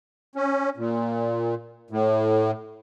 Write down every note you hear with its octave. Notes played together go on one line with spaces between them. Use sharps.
C#4
A#2
A2